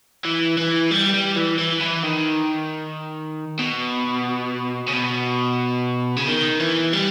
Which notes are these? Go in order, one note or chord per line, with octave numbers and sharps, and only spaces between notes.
E3
E3
G3
G3
E3
E3
E3
D#3
B2
C#3
B2
C#3
D#3
E3
G3